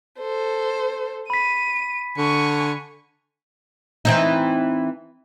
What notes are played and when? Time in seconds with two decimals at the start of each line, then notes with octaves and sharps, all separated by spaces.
0.19 A4 C5
1.30 B5 B6 D#7
2.18 D3 G#5 C#6
4.05 E3 C4 D#4